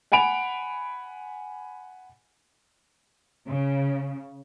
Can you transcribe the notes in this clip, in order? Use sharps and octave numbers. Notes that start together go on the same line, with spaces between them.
F#5 G#5 B5 D7 F7
C#3